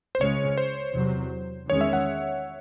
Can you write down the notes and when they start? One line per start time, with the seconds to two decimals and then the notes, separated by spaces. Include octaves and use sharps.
0.15 C5
0.21 C#2 C#3 G#3 C#4 C#5
0.57 C5
0.95 E2 C3 F#3
1.69 E2 D#3 G#3 C#4 C#5
1.81 E5
1.93 F#5